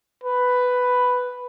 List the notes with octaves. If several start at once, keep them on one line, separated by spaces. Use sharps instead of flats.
B4